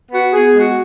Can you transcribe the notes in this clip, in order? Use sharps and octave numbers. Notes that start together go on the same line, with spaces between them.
B3 F#4
B3 G#4
G#3 F#4